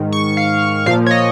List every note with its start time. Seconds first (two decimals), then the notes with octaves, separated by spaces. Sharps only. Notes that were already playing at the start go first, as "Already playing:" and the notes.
Already playing: G#2 D#3
0.12 C#6
0.37 F5
0.86 A#2 F3 F5
1.06 C#5
1.11 D#5